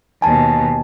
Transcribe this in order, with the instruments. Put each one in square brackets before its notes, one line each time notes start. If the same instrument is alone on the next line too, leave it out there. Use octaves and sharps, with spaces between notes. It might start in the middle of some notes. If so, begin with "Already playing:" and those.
[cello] D#2 B2 [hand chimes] G#5 A5